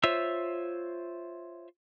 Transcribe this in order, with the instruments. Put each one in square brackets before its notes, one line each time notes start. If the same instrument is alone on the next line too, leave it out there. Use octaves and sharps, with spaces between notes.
[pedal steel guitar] F4 C5 C#5 E5 E6